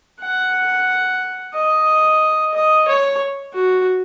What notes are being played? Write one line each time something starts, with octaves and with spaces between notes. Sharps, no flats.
F#5
D#5
D#5
C#5
F#4